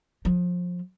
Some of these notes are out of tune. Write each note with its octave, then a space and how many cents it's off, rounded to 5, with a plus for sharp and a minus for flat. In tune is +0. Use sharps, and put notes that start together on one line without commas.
F3 +25